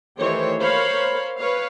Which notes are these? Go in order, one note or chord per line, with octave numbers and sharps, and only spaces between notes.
D#3 E3 A3 G4 C5 C#5
A#4 C5 C#5 F5 B5
B4 C#5 F5